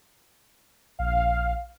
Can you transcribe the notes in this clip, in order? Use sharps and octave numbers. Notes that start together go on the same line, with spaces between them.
A#1 F5